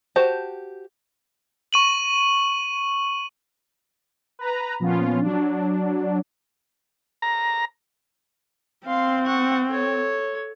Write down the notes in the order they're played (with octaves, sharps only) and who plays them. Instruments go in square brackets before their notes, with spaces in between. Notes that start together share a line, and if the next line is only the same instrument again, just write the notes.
[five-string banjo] F#4 G4 C5 A5
[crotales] C#6 D#7 F#7
[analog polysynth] B4 A#5
A#2 F3 B3 C#4 F4
F#3 D4
[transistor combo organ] A#5
[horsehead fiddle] C4 [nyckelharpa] F5 C6
[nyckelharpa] F#5 C#6
A4 C#5